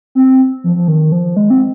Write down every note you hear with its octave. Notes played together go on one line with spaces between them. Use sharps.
C4
F3
F3
D#3
F3
G#3
C4